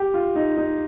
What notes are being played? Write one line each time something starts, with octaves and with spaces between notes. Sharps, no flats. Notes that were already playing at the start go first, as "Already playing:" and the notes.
Already playing: G4
F4
D#4
D#4